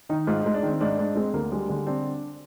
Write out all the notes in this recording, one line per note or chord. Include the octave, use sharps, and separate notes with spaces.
D#3 D#4
G#2 F4
G#3 D#4
D4
D#3 C4
G#2 D4
G#2 D4
G#3 C4
D2 A#3
G3 G#3
D3 G#3
C4 D4